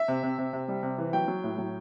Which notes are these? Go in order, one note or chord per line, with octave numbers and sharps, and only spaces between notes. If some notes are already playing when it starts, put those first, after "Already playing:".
Already playing: E5
C3
C3
C3
C3
G3
C3
E3
F#3 G5
F#3
A2
F#3